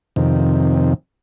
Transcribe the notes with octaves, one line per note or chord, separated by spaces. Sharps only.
F2 C3 D#3